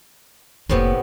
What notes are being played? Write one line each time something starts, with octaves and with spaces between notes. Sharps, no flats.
F1 A2 C3 A#3 B3